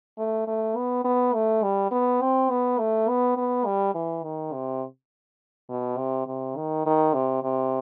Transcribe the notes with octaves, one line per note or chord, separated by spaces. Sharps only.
A3
A3
B3
B3
A3
G3
B3
C4
B3
A3
B3
B3
G3
E3
D#3
C3
B2
C3
C3
D#3
D#3
C3
C3